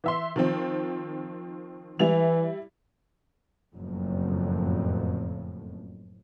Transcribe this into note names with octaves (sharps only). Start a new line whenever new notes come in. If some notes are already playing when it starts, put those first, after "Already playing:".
E3 E5 C6
D#3 F3 C4
E3 G3 E4 F7
F#1 F2 A2